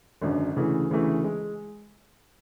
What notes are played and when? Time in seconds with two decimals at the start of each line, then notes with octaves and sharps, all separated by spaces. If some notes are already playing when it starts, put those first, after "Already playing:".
0.22 G#1 F#2 D3
0.56 D2 C#3 E3 A3
0.91 D2 C#3 E3 A3
1.24 G#3